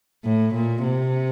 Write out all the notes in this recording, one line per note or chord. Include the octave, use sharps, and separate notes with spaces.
A2
A#2
C3